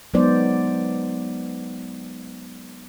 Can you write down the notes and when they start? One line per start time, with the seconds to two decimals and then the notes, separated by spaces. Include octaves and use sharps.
0.14 F#3 G#3 B3 D#4 C5 D5